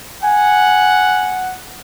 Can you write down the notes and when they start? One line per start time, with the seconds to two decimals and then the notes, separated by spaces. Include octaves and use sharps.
0.23 F#5 G#5